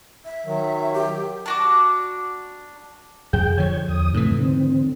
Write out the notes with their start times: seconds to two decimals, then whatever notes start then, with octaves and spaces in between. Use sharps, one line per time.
0.25 E5
0.45 D#3 F#3
0.93 G4
1.46 D4 F#4 D6
3.33 F2 G#4 G5 G6
3.57 D3 F3 C#5 G#6
3.88 E2 D#6
4.14 G#2 C3 E3 A3
4.40 D3 C4